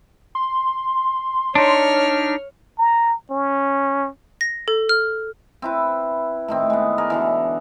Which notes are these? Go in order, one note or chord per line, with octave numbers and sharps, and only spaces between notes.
C6
D4 D#4 C#5 F6
A#5
C#4
A#6
A4
F6
C4 E4 B4
A2 D#3 C4
G#3 B3
G#4 A#4 D5
B2 D3 E3